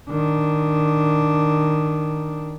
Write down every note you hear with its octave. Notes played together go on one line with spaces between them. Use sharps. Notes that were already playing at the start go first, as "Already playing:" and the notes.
D#3 D4